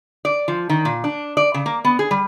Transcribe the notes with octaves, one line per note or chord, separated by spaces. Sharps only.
D5
F3
D#3
A#2
D4
D5
C#3
A#3
B3
G#4
G3